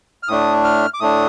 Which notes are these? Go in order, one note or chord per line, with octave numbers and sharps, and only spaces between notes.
F6
A2 A3 D4 D#6
F6
D6
A2 A3 D4 D#6